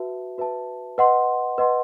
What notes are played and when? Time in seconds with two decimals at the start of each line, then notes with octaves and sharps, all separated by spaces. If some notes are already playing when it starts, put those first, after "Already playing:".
Already playing: F#4 B4 E5 A5
0.38 F#4 B4 E5 A5
0.98 B4 D#5 F#5 C6
1.58 B4 D#5 F#5 C6